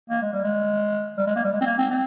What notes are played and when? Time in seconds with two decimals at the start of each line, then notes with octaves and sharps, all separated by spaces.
0.10 A#3
0.22 G#3
0.33 G3
0.44 G#3
1.18 G3
1.27 G#3
1.36 A#3
1.44 G3
1.53 G#3
1.61 C4
1.66 A#3
1.78 C4
1.90 C4